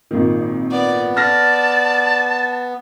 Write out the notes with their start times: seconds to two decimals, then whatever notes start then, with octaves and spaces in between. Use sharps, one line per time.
0.11 G#1 A#2 D#3
0.72 B3 D5
1.17 D5 A5 F6 A#6